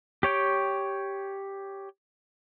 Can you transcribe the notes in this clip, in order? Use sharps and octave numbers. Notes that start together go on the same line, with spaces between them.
G4 C#5 G5